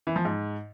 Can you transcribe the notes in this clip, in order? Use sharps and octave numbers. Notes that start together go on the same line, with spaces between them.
E3
F3
G#2